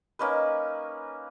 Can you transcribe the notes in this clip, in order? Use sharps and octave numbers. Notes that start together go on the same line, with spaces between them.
A#3 C#4 D#4 B4